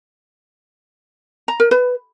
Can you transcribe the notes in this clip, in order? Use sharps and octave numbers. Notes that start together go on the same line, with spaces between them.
A#5
A#4
B4